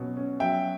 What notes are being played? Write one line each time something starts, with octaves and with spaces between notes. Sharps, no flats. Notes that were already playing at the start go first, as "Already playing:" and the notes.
Already playing: B2 F#3 C#4
C#4
F#3 E5 G5